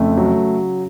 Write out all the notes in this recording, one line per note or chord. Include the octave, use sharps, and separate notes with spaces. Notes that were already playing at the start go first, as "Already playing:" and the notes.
Already playing: F2 C#3 A3
F#3